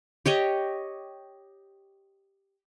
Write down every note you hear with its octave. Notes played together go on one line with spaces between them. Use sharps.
G4 C#5 D#5